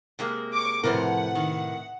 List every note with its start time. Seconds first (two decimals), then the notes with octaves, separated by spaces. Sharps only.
0.19 C3 G#3 A#3
0.53 C#6 D6
0.83 F2 A2 C3 F3 A#4 B4 F#5
1.35 D#3